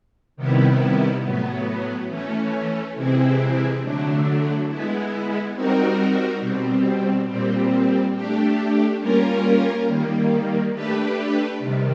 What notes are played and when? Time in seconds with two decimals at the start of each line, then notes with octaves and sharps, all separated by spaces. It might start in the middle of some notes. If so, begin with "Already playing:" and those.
0.36 C3 D#3 G3 B3 E4
1.22 A2 F#3 B3
2.08 E3 A3 C#4
2.95 C3 E3 G#3 C4 E4
3.82 D3 F#3 A3 D4
4.68 G#3 B3 E4
5.54 G3 C4 D#4 F#4 A#4
6.41 B2 G3 C4
7.27 A#2 G3 C4
8.14 A3 D4 G4
9.00 G3 A#3 C#4 F4 A#4
9.87 D#3 G3 A#3
10.73 A3 D4 G4 B4
11.59 C3 D#3 G3